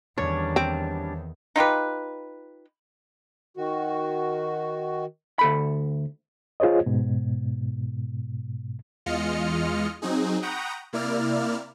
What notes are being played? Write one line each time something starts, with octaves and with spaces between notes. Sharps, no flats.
E2 D#3 G3 C#4 D4 C#5
C4
D#4 F4 G4 B4
D#3 F#4
D2 A4 B5
F4 G#4 C5 C#5 D#5
G#2 B2
E2 G#3 F4 D#5 F6 C#7
F#3 C4 D#4 G#4
F#5 G5 A#5 B5 C#6 D#6
C3 A#3 E4 D5 F6